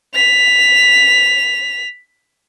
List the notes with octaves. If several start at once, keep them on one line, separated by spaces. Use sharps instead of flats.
B6 F7